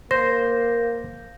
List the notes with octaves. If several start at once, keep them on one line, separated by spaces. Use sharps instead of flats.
A#3 C5 G6 A#6